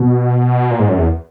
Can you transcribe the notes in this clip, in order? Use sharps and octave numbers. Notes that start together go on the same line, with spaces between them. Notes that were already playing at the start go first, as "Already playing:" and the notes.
Already playing: B2
A#2
G#2
F#2
E2